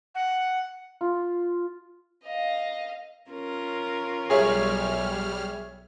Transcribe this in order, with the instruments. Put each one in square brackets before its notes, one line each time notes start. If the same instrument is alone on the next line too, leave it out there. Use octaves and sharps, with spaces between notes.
[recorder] F#5
[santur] F4
[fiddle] D#5 F5
[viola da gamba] C#4 F4 A#4
[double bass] B1 [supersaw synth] G3 F6 [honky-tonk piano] G#4 C#5 E5